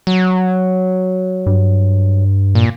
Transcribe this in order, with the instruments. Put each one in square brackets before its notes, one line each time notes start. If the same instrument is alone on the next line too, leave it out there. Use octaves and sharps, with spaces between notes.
[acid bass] F#3
[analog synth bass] G2
[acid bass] A#2